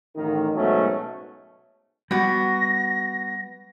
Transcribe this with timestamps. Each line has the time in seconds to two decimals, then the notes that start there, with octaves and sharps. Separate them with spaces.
0.16 A1 D#3
0.55 G#2 B2 F#3 A3 C#4
2.11 G3 B3 F#4 A#6